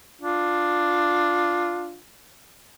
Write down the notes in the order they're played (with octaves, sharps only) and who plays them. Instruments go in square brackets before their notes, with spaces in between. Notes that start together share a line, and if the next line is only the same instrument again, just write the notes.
[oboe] D4 [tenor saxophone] F4